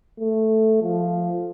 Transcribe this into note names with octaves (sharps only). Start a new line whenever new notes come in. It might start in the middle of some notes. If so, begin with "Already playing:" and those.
A3
F3